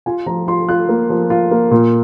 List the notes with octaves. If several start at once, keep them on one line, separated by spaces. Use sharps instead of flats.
F4 G#5
F3 A#5
F4 C6
F4 F#6
A#3
F3
F4
A#3
A#2